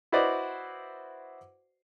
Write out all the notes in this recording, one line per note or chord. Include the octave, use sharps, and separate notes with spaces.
E4 F#4 B4 C5 D5 D#5